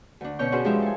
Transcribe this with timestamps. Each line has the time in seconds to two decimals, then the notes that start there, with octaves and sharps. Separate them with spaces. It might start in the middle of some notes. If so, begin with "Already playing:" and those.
0.21 D2 D4
0.39 B2 C#4 C#5 C#6 G6
0.52 C#4 D4 F#4 G#4 B4 C5
0.65 F3 G#3 D#4 G4 C5 E5
0.82 A4 G#5